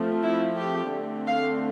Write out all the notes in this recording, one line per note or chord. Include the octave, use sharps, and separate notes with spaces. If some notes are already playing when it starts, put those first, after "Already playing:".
Already playing: F3 A3 C4
E4
G4
D3 A3 C4
F5